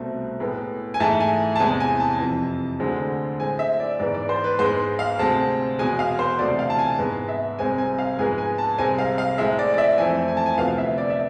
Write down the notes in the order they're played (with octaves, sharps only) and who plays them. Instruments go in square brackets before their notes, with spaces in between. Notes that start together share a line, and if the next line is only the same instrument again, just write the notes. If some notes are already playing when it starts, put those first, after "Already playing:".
Already playing: [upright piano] C2 B2 A3 C4
A2 G#3 B3
G#5
G#2 E3 A3 A5
G#5
A5
E2 C3 E3 G#3 G#5
G#5
A5
F2 C3 E3
D2 D3 G#3 C4
A2 G#3 C4 G#5
E5
D5
G#2 E3 B3 D5
D5
C5
B4
G#2 G#3 B3 C5
F5
D2 C3 G#3 C4 A5
E2 B2 G#3 G#5
F5
C5
D2 C3 E3 A3 D5
F5
A5
G#5
G#2 G#3 B3
E5
C2 C3 G#3 C4 G#5
G#5
F5
G#2 F3 G#3 B3 G#5
G#5
A5
C2 C3 G#3 C4 G#5
F5
F5
A2 G#3 C4 E5
D5
D5
E5
F2 E3 A3 C4 G#5
G#5
A5
G#5
D2 C3 F3 B3 F5
E5
D5
E5